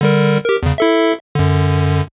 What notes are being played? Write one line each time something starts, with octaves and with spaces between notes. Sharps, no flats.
D3 G3 A#4
G4 A#4
E2 C#3
E4 A4 E5
F#2 D3